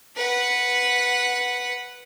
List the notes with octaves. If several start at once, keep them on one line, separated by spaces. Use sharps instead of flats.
B4 F#5